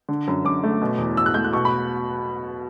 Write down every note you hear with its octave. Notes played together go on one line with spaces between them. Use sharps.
D3
F#2
F#2 D6
A3
B2
E2
E2 E6
F#6
A3 G6
F#6
B2 C#6
B5